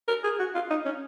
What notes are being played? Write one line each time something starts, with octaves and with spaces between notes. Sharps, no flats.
A#4
G#4
F#4
F4
D#4
C#4